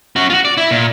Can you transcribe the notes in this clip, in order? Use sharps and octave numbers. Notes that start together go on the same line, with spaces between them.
C#4 F#4
F4 F#4
D5
E4
A#2